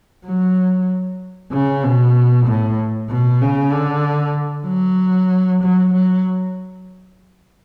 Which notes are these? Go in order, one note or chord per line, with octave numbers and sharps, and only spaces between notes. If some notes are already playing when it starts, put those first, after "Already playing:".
F#3
C#3
B2
A2
B2
C#3
D3
F#3
F#3
F#3